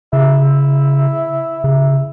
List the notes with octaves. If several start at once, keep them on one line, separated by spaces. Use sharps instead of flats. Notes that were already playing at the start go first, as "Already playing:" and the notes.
C#3 E4
C#3